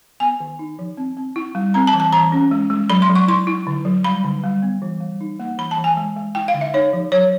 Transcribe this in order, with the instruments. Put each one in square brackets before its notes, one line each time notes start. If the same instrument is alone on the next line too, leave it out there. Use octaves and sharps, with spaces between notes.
[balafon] B3 G#5
D#3
D#4
F3
C4
C4
E4
G3
C4 A#5
A5
E3
A5
E3 A#5
C#4
G#3
G#3
F#3 B5
C6
F#3
C#6
E4 C6
E4
D3
F#3
G3 B5
D3
G3
B3
E3
G3
D#4
A#3
E3 B5
A5
E3
G#5
G#3
G#3
E4 G5
F5
D3
E5
D#4 C#5
F3
F#3 C#5